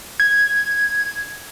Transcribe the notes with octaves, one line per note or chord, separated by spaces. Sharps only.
G#6